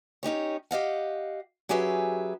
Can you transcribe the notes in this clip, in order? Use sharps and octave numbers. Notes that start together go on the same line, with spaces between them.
C#4 D#4 G4 C#5
G4 D#5 F5 F#5
F#3 C#4 G4 G#4 B4 E5